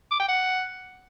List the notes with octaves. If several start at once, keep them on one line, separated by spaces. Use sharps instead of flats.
D6
G5
F#5